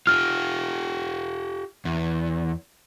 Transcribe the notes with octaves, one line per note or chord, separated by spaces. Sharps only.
F4 G4 F6
E2